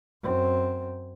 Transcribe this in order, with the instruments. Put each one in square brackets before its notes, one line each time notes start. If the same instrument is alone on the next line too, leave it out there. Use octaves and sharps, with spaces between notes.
[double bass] F#2 C4